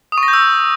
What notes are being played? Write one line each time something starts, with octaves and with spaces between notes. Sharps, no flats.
D#6
C#6
A#6
G6
E6